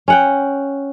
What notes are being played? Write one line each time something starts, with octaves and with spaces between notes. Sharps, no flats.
C#4 F#5 G5